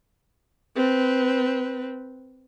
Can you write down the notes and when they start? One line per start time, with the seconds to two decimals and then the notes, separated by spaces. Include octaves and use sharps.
0.76 C4 B4